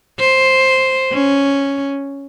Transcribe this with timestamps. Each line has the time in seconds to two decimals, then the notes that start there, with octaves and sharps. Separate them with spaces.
0.20 C5
1.12 C#4